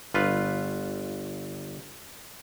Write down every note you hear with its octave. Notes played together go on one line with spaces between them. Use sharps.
G1 F4 B4